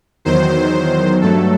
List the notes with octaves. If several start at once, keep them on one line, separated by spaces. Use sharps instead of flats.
E2 D#3 F#3 C5
G2 F#3 A3 A4